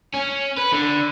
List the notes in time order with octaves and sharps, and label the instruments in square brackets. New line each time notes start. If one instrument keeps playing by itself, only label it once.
[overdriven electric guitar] C#4
B4
D3